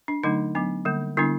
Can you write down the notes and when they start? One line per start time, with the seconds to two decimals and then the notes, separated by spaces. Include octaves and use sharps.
0.08 D4
0.23 D3 F#3 A3 D4 D#4
0.55 F#3 B3 D4
0.85 D3 G3 A#3
1.17 D3 G3 B3 D4 E4